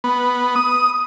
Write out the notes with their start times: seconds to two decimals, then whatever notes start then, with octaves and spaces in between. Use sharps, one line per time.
0.04 B3
0.56 D#6